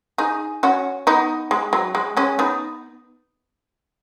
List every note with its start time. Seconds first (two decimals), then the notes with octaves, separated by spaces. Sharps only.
0.18 D#4 G#4
0.63 C#4 F#4
1.07 B3 D#4
1.51 G#3
1.73 F#3
1.95 G#3
2.17 G#3 C#4
2.39 B3 D#4